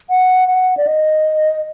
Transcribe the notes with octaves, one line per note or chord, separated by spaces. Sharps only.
F#5
F#5
D5
D#5